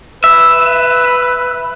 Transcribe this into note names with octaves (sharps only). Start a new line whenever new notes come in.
B4 E5